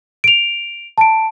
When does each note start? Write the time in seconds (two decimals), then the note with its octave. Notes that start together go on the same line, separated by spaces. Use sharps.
0.24 D7 F7
0.98 A5 D7